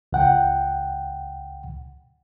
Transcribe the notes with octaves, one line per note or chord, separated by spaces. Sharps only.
C#2 F#5 G5